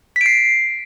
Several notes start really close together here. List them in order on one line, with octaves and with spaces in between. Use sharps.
B6 D7 C7